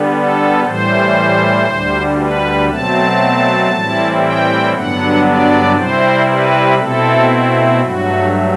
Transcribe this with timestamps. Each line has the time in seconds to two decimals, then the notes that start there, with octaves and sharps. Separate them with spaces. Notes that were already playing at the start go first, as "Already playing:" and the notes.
Already playing: D3 G3 B3
0.14 A4
0.65 A2 E3 G3 C5
1.68 D2 D3 G3
2.19 B4
2.69 B2 F#3 A3 C4 A5
3.72 A2 E3 G3 C4 E4
4.23 G5
4.74 G2 D3 F#3 B3 D4 F#5
5.26 D5
5.77 C3 G3 C4 E4 C5
6.29 B4
6.79 B2 A3 C4 E4 A4
7.81 G2 F#3 A3 F#4